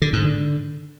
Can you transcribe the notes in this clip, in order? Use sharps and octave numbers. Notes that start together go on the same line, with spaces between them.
D3
G#2
D3